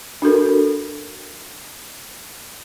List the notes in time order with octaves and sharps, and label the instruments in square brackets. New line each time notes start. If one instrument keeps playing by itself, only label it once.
[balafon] D4 F#4 A4 A#4